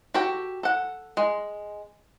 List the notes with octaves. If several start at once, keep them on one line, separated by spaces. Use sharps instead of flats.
F#4 G4 A4 G5
A4 F#5
G#3